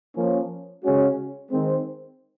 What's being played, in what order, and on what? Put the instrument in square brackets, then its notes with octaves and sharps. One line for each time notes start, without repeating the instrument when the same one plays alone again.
[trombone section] F3 A#3 C#4
C#3 G#3 C#4 F#4
D#3 G#3 C4